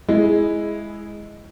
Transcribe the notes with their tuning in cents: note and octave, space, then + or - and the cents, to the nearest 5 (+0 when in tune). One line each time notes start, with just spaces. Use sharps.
G#3 +0 E4 +0 G#4 -15